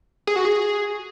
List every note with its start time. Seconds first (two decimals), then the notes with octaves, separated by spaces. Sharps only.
0.27 G#4
0.36 F#4
0.45 G#4